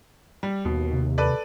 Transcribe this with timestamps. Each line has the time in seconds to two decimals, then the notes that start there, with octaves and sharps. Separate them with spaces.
0.43 G3
0.65 D#2 B2
0.93 C3
1.18 A4 B4 D5